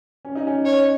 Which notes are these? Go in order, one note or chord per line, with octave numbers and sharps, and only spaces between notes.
C#4
D#4
C#4
C#5